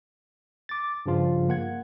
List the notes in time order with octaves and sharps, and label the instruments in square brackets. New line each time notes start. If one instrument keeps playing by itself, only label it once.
[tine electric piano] D6 A6
G2 C#3 F3 F4
A#3 F#5 G#6